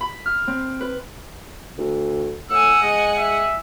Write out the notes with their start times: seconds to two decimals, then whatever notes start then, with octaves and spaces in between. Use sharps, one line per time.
0.01 B5
0.26 F6
0.47 C4
0.81 B4
1.78 D2
2.50 A2 F#5 G#5 E6
2.82 G#3 D#5
3.17 E5